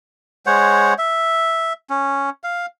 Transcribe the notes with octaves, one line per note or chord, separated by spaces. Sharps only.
G#3 C5 C#5 F#5
E5
C#4
F5